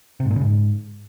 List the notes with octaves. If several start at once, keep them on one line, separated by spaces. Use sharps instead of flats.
C3
G#2
A#2
C#3
G#2